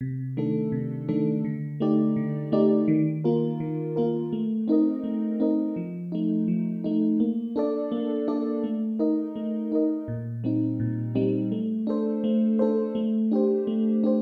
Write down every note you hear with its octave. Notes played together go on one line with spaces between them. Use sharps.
C3
D#3 A3 D4 A4
C3
D#3 A3 D4 A4
D3
A3 D#4 G4 D5
D3
A3 D#4 G4 D5
D#3
A#3 F4 A#4
D#3
A#3 F4 A#4
A3
C4 D#4 A#4 D#5
A3
C4 D#4 A#4 D#5
F3
A3 D#4
F3
A3 D#4
A#3
D4 A4 D5
A#3
D4 A4 D5
A3
D#4 A#4 D#5
A3
D#4 A#4 D#5
A#2
G3 C4 D#4
A#2
G3 C4 D#4
A3
D4 A4 C5
A3
D4 A4 C5
A3
D4 G4 C5
A3
D4 G4 C5